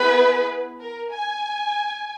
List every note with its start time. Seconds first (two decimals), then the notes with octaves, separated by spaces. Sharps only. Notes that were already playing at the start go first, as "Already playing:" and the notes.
Already playing: B3 E4 G#4 B4
0.80 A#4
1.12 G#5